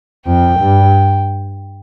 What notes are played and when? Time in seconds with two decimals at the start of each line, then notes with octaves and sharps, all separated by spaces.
0.26 F2 G5
0.60 G2